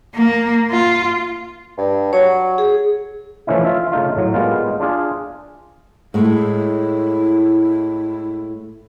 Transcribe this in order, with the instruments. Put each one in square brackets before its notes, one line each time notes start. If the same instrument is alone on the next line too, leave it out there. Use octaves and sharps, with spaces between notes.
[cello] A#3
F4
[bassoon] G2
[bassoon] F#3 [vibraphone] C#5
[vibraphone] G#4
[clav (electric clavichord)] E3 F3 A3 C#4 D#4 E4
F4 E5
C#3 A3 D#4 F4
A2 F#3
G3 G#3 A#3 B3 D#4 F4
D4 F4 G#4
[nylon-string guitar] A2 G#3 [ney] E4